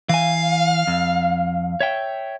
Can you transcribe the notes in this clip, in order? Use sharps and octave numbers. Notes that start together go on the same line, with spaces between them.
E3 F5 G#5
F2
C#5 E5 G5